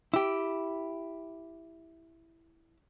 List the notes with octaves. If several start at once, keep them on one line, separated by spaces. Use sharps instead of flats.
E4 G4